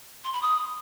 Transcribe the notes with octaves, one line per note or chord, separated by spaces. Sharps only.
C6
B5
D#6